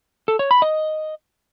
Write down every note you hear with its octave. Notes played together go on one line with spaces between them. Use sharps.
A4
C#5
B5
D#5